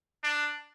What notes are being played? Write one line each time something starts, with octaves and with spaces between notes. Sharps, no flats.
D4